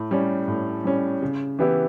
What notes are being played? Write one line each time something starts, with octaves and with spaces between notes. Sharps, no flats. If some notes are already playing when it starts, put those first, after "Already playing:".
Already playing: A2
G3 C#4
A2
G3 C#4
C#3
E3 B3 E4 G4